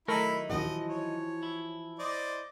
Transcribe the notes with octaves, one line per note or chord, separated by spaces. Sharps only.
D#3 F#3 A3 D#4 E4 A#4 B5
A#1 D#2 E3 F3 F#4 D#5
C#5
E4
C5 D5 D#5